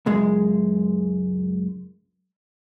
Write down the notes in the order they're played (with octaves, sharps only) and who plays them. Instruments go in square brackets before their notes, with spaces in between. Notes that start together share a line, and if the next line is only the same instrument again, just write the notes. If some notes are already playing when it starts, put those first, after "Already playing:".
[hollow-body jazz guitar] C#2 F#2 G#3